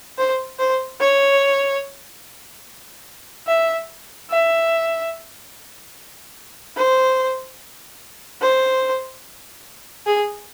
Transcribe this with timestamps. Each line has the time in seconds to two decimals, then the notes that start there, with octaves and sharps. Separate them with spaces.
0.18 C5
0.59 C5
1.00 C#5
3.47 E5
4.30 E5
6.77 C5
8.41 C5
10.06 G#4